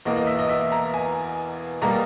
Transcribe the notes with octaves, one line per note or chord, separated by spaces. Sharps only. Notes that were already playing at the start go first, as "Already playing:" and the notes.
E2 B2 A#3 D#5
D#5
E5
D#5
E5
A#5
G#5
B2 G3 A#3 A#5